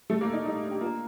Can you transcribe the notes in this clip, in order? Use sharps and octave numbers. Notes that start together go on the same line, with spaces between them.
G3 A3
A#3
A4
D#4
G3 D#4
D4
G4
A#3 F4